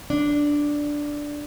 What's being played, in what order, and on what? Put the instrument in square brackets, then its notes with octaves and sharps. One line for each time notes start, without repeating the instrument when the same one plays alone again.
[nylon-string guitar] D4